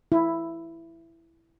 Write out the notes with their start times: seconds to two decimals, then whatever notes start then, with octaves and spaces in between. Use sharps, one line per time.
0.12 E4